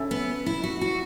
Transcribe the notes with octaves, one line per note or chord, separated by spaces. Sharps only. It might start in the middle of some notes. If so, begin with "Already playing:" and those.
Already playing: C#4 A4 E5
B3
E4
F#4
F#4